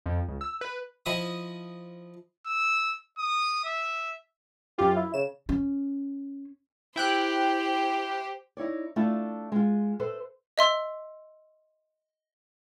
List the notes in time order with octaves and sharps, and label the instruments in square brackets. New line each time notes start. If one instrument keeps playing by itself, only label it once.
[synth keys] F2
C#2
E6
B4
[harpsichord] F3 E4 D#5 E5 D#6
[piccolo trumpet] E6
D#6
E5
[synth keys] F#2 F4 [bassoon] G4
[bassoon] E4
[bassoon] C#3 [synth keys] E7
[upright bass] C#4
[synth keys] E4 G5 F#6 [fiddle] G4 C5
[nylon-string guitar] D#4 E4 C#5 D5
A3 D4 E4 F4
G#3 F4
A4 B4 C5 E5
[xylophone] D#5 E5 C6 E6